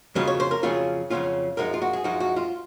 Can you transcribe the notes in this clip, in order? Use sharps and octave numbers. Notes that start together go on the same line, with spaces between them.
F2 C#3 F#3 C#4 F4 D#5
C#5
C5
A#4
F2 C#3 F#3 C#4 F4 G#4
F2 C#3 F#3 C#4 F4
F#2 F3 G#3 D#4 A#4
F4
F#4
G#4
F#2 F3 G#3 D#4 F#4
F#4
F4